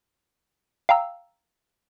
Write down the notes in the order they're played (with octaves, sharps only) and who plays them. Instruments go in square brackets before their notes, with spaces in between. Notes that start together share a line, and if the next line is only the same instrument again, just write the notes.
[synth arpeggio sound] F5 G5 A#5 E6